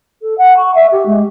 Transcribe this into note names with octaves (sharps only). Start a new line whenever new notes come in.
A4
F#5
C#6
E5
G4
G#3